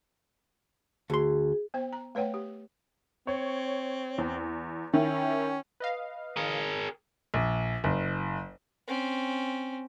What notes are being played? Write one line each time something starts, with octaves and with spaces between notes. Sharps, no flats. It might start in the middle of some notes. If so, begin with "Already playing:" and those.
D2 G#4 C6
B3 C5 G5
A#5
A3 B4 C#5 F#5 G5
G4
C4 C#5
E2
D#3 C#4 E4
B4 D#5 F5
G#4 A#4
A#1
F#1
C4 C#4